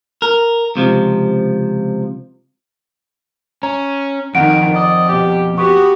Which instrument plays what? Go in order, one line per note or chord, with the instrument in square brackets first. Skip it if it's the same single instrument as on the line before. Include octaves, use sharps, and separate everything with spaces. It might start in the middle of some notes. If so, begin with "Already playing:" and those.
[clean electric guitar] A#4
C#2 C3 F3
[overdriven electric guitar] C#4 [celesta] A#5
[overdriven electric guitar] F2 [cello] D#3 D#4 [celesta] F#5 D7
[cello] D5 [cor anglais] D#5
[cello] B2 [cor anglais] G4
[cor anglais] B3 [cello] F#4 G4 [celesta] C#6